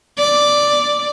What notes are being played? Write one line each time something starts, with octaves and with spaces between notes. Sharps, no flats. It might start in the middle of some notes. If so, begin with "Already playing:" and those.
D5